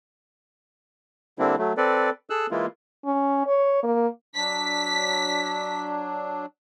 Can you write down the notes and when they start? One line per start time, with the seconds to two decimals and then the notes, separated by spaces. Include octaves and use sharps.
1.39 D3 G3 A#3 C4 D4 E4
1.58 F#3 A3
1.77 C4 A4 B4 D5
2.30 G#4 A4 E6 F#6
2.51 E3 G#3 A#3 E4 F4
3.05 C#4
3.47 C#5
3.83 A#3
4.36 F#3 D4 B6